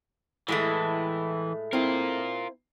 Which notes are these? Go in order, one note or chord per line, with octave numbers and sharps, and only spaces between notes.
A2 E3 G#3 A3
C4 E4 F4 A#4